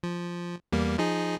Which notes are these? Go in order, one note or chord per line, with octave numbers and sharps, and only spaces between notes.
F3
E2 G3 A#3
F3 D#4 G#4